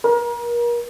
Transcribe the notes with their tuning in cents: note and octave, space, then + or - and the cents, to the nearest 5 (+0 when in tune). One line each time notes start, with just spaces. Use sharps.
A#4 +35